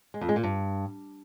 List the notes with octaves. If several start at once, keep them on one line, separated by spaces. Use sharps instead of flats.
G#3
F2
G#3
A#2
G2